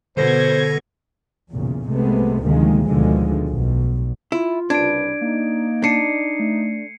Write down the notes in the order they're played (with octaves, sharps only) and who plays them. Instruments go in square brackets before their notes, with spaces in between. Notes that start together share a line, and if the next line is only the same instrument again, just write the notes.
[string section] B2 G#6 [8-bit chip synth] D3 A4 A#6 [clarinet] C5
[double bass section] B1 E2 A#2 C#3
C2 C3 G#3 A3 B3
D2 C3 D#3 F3 G#3 A#3
D2 B2 D3 D#3 F3 G#3
B1 B2
[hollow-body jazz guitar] E4 [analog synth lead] F4
[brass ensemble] C2 C#3 B4 [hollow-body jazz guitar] D4 [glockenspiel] G#6 D7
[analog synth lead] A#3 [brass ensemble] D#4
[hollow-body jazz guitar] D4 [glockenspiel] C7 C#7 D#7
[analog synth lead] A3